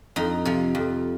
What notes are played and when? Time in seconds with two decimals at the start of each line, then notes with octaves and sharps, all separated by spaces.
0.16 F2 D#4
0.45 C3 F3
0.75 F2